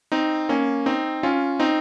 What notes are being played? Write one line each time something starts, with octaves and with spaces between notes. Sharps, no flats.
C4 D#4
A#3 C#4
C4 D#4
C#4 F4
C4 D#4